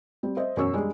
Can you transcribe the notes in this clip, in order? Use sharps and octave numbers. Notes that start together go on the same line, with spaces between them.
G3 C4
C5 D#5 E5
E1 F#2 C#5 C#6 E6
G3 G#3 D4